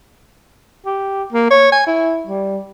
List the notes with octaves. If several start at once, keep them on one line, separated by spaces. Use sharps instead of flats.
G4
A#3
C#5
G#5
E4
G3